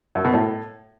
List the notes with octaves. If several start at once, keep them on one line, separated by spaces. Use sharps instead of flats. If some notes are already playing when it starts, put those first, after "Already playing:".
F#2
B2
A2